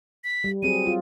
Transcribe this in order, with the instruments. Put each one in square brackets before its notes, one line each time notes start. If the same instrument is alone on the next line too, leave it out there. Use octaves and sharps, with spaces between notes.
[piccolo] B6
[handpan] G3
[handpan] F#3 C4 G#4 [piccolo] D#7
[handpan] F4